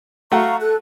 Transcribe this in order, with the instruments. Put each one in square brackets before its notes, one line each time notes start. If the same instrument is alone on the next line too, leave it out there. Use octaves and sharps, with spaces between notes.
[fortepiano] A3 F#4 [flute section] F5 A#5 C#6
[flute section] A4 F#6